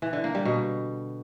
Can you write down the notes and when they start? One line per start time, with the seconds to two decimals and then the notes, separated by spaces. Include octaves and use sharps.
0.02 E3
0.13 D3
0.24 A#3
0.35 G3
0.45 B2